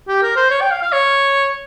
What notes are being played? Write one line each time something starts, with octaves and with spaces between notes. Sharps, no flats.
G4
A#4
C5
C#5
G5
F5
F5
C#5